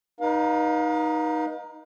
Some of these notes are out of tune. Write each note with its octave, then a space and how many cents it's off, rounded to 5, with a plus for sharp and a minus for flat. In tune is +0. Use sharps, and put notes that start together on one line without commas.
D#4 +0 B4 -45 F5 +30